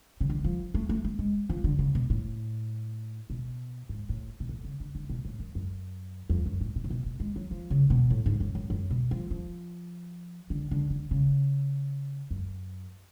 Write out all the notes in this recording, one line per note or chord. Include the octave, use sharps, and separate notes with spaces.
C#3
D3
F3
A3
A3
A3
G#3
F3
D3
C#3
B2
A2
B2
G#2
A2
B2
A2
C#3
D3
D3
B2
A2
F#2
F#2
F2
F#2
A2
B2
A2
B2
B2
G#3
F#3
F3
C#3
B2
A2
G#2
F#2
F#2
F#2
B2
F3
F3
D3
D3
D3
C#3
F#2